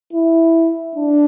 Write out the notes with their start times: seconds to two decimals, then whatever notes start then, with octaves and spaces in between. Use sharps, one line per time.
0.13 E4
0.95 D4